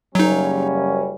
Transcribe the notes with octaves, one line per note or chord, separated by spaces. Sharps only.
F#1 F#3 G3 C#4 D#4